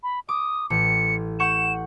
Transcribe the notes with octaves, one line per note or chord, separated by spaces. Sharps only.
B5
D6 D#6
A1 C#7
F#5 C#6 G6 E7